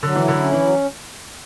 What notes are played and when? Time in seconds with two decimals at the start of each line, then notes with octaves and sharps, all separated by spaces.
0.03 D3 F#3
0.16 E3
0.22 E4
0.28 D3
0.40 C#4
0.53 E3
0.60 F#3